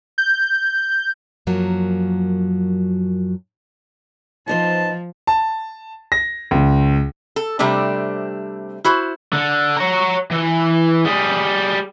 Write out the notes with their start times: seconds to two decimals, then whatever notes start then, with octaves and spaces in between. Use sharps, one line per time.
0.18 G6
1.47 F#2 F3 F#3 A#3
4.48 F3 B3 D#4 C5 A5
5.27 A5
6.12 A#6
6.51 C#2
7.36 A4
7.59 C3 G3 A3 C4 D4
8.84 E4 F#4 C5
9.33 D3
9.77 C#5 A#5
10.31 E3
11.06 G3 G#4